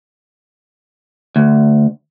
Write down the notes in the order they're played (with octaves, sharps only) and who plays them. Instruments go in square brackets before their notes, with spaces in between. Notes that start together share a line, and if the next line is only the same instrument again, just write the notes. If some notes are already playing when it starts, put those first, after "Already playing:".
[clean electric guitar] D2